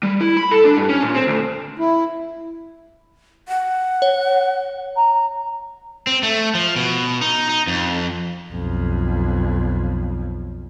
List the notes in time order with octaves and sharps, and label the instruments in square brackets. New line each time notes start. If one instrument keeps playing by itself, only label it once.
[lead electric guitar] G3
E4
B5
A4
D4
G2
C#4
A#2
C4
D2
[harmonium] E4
[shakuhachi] F#5
[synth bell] C#5
[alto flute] A#5
[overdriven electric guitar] C4
A3
F3
B2
D#4
D#4
F2
[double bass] B1 F2